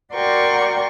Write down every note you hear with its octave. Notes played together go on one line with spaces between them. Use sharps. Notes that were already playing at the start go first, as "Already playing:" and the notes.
F#4 A#4 D5 G5 C6 C#6